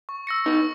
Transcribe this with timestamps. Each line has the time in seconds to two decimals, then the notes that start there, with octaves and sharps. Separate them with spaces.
0.09 C#6
0.27 E6 A#6 C#7
0.46 B3 D#4 C#6